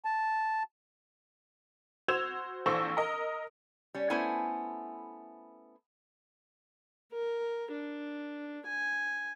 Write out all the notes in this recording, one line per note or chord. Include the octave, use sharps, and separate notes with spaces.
A5
F#4 C5 E6 G#6 E7 F7
A#1 E3 A4 C5 C#6 E6
A#4 D#5
G3 C#4
A3 B3 C#4 E4 C5 G#5
A#4
D4
G#5